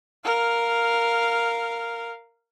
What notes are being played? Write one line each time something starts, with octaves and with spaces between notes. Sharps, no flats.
A#4 F5